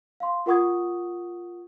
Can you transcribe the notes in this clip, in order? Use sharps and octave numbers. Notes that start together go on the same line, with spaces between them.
F5 C6
F4 A#4 F#5 C#6 D#6 G#6